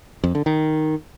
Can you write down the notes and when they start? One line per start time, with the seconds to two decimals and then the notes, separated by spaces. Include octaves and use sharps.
0.24 F2
0.35 D3
0.46 D#3